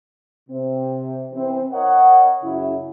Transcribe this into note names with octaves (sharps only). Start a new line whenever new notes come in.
C3 C4
E3 C4
A#4 C#5 D#5 F#5
F#2 C#3 E4